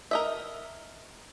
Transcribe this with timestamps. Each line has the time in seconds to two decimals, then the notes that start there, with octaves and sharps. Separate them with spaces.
0.11 A#4 D#5 E5